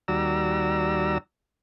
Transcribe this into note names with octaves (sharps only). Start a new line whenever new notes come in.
D#2 G3 F#4 D5 A#5 E6